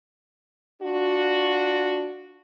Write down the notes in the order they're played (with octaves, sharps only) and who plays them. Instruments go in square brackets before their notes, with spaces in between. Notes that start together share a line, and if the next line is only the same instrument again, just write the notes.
[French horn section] D4 F4 F#4